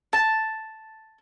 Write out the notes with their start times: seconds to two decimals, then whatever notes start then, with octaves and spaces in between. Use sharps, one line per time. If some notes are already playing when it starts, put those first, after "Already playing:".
0.13 A5